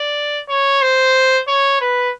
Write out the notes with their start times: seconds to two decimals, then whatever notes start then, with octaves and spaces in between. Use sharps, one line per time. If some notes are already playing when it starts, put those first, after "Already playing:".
Already playing: D5
0.49 C#5
0.82 C5
1.48 C#5
1.81 B4